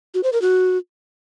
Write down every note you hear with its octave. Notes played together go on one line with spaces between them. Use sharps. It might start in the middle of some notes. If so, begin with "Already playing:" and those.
F#4
C5
A#4
F#4